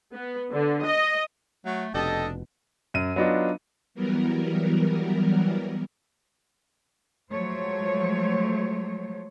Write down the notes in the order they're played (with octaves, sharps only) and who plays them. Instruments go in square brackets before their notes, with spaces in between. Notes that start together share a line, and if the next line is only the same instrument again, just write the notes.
[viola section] B3
D3
D#5
[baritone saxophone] F#3 [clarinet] A3
[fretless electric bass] F1 B2 [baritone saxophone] D4 [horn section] G4 D#5 A5 [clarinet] A4
[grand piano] F#2 D#7
F#3 B3 D4 D#4 F4
[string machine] E3 F#3 G3 B3 A#4
[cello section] F3 F#3 G#3 A3 C5 C#5